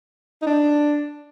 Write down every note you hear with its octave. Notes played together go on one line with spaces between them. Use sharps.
D#4
D4